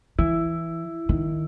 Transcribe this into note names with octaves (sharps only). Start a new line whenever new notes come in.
E3 E4
D#3